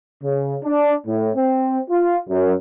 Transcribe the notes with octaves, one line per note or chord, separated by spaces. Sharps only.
C#3
D4
A2
C4
F4
F#2